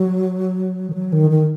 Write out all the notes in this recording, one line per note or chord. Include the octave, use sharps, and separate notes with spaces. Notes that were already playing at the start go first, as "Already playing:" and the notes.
Already playing: F#3
D#3
F#3
D#3
D#3